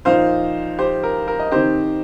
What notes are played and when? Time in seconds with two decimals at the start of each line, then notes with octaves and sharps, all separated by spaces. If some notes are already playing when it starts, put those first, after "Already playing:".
0.05 A#2 F3 D#4 C5 F5
0.78 G4 C5
1.03 A#4
1.28 A#4
1.39 D#5
1.51 D#3 C4 D#4 G4 C5